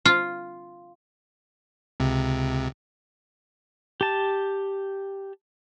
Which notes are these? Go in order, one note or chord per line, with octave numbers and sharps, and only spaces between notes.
F4
C#2 C3
G4 A5